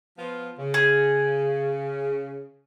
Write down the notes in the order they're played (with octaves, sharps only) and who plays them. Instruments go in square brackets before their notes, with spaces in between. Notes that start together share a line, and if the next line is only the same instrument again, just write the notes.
[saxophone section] F3 B3 F4
C#3
[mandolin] G#4